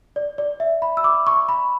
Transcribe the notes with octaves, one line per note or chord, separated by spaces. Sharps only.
D5
D5
E5
B5
E6
D6
C#6
B5